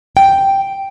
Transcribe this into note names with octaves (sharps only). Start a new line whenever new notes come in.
G5